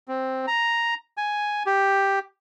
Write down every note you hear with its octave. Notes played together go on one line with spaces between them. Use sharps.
C4
A#5
G#5
G4